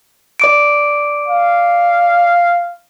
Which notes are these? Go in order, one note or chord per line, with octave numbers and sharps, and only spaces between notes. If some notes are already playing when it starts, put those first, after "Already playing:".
D5 D6 D7
F5